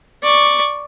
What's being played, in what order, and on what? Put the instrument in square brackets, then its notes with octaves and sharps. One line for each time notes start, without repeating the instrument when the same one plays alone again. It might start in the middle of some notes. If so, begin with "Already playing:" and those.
[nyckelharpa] D5 C#6